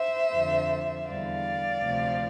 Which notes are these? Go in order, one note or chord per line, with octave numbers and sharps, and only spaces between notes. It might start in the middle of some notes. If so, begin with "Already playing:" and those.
Already playing: C5 E5
F2 D3 F3
E2 D3 G3 D5 F5
D2 C3 F3